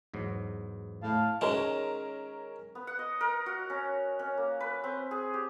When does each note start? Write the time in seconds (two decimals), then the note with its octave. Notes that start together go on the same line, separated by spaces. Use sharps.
0.14 E2 G#2 F#3
1.02 A2 F5 A5
1.41 D#3 G#3 C#4 A#4
2.75 B3
2.87 F#5
2.99 D#5
3.21 A#4
3.46 F#4
3.70 C#4
4.19 C#4
4.38 A#3
4.60 B4
4.84 C4
5.11 G#4
5.34 G4